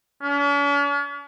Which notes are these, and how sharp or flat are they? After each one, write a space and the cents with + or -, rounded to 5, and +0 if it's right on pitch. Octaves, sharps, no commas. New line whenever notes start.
C#4 +45